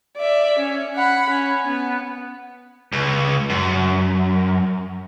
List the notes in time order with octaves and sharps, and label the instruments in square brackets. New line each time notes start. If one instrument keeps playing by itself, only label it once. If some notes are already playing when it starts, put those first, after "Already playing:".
[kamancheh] D5 E5
C#4
F#5 B5
C#4
B3
[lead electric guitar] C#2
F#2